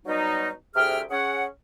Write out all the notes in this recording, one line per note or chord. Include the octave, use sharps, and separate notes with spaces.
B2 F#3 G3 D#4
D2 C3 G#4 E5 G5 F6
C#4 G#4 F#5